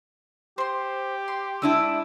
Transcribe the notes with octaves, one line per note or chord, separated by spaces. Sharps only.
G4 C5 C6
C6
G#3 D4 E4 E6